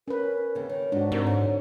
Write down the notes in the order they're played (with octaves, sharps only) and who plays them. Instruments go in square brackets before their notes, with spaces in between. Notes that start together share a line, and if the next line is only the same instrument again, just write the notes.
[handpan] C#4 B4 [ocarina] A#4
[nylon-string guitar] D#2 C#3
[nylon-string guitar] D#3 [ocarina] C#5
[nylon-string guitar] G#2 [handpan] D4 F#4
[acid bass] G#2 [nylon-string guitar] C3 [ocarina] A#4
[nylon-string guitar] D3 [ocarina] C#5